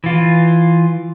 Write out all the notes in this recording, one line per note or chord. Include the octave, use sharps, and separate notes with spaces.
E3 F4